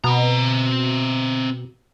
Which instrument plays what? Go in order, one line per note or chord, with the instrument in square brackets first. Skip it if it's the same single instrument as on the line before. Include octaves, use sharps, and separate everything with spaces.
[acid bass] B2 [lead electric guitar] C4 A#5